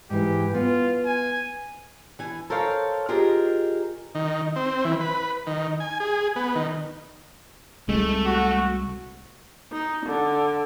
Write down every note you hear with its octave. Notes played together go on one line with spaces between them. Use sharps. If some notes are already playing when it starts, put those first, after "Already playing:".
G#2 E3 G4
B3 F4
G#5
E3 G#5
A4 A#4 C5 C#5 F5
F4 G4 G#4 A#4 C5 D#5
D#3
C4
E3
B4
D#3
G#5
G#4
B3
D#3
C2 G#3 A3
F#4
D#4
D3